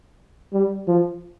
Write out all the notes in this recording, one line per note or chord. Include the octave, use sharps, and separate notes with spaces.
G3
F3